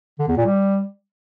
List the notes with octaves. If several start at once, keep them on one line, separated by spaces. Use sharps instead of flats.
D3
E2
A#2
G3